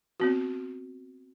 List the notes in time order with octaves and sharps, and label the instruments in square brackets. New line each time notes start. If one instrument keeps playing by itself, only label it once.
[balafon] B3 C4 F#4